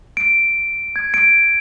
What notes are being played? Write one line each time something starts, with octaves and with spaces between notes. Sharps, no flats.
D7
G#6
D7